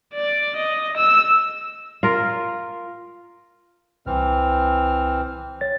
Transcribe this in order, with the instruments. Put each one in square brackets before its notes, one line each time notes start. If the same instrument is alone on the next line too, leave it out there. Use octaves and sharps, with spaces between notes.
[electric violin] D5
D#5
E6
[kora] F4 A#4
[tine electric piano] C2 [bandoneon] E3 C4 F6
[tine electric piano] C#5 A6